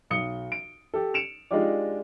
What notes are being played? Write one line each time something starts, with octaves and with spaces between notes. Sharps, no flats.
B1 D#6 C#7 G7
D7
G4 A4
C#7 D7 E7 F7
G#3 D4 D#4 F4 G4 D5